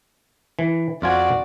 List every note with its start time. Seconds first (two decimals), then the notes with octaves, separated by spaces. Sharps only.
0.59 E3
1.02 F2 F4 F#4 D5 G#5